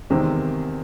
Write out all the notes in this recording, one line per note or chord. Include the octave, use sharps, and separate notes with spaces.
E2 C3 D#3 G#3 C4